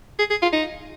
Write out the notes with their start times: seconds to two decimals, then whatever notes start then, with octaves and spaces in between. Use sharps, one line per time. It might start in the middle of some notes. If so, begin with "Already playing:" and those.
0.19 G#4
0.30 G#4
0.42 F4
0.53 D#4